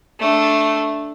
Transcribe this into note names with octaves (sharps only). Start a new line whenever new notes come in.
A3 D4